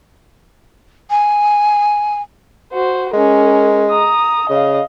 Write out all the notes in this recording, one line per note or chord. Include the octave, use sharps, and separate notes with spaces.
G#5
F#4 C5
G#3 C#4 A#4
A#5 D#6
C#3 D#5 F5